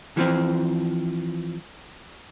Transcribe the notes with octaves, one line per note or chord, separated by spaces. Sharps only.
E3 F3 C4